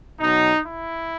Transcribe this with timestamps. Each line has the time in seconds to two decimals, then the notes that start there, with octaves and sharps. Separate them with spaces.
0.20 B2 F#3 D#4
0.64 E4